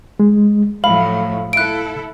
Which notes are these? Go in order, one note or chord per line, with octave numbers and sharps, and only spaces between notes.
G#3
A2 F3 F#3 E5 F5 B5
E4 A4 F#6 D7